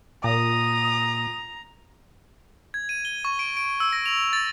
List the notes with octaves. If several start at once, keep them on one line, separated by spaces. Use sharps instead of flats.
A#2 A#5 D#6
G#6
D#7
G7
C#6
D7
D7
E6
A#6
F7
A6